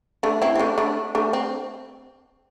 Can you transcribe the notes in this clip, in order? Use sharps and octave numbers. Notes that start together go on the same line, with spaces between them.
A3 D4
C4 E4
C4
A3 D4
A3 D4
A3 D4
C4